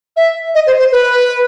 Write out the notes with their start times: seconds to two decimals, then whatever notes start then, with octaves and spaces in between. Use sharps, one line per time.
0.17 E5
0.55 D#5
0.67 C5
0.79 C5
0.92 B4